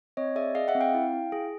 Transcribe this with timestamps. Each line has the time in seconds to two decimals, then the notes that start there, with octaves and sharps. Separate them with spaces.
0.17 C4 C#5 D#5
0.36 G#4 D5 E5
0.55 G#4 D#5 F5
0.68 E5 F#5
0.75 C4
0.81 F5 G5
0.94 E4
1.13 E4
1.32 G#4